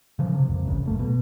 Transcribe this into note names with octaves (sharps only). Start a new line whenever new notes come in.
C#3 F3
C3
A#1 F2
D1 G#1 D2 C#3
F#1 A3
B2